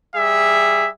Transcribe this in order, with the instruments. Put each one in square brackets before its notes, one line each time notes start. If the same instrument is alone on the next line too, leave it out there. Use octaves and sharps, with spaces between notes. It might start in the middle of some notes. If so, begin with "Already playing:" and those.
[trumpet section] G3 G#4 E5